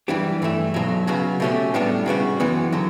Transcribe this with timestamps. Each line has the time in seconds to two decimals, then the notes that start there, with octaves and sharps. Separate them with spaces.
0.08 F#2 E3 G3 D4 G4
0.42 G2 E3 A3 E4
0.74 B1 B2 F#3
1.07 C#3 F#3 B3 F#4
1.40 B2 A3 C#4 G4
1.74 A2 G3 B3 D4
2.06 C#3 G3 B3 F#4
2.40 F#2 E3 B3
2.72 D3 F#3